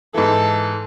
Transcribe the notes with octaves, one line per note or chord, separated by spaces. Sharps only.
G#2 E3 A4